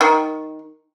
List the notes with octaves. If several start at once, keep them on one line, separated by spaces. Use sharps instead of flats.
D#3